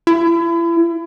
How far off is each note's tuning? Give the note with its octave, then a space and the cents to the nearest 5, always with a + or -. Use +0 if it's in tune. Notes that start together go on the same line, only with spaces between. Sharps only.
E4 +35